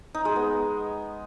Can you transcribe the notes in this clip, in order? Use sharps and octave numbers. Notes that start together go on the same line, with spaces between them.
D#4
G#3
B3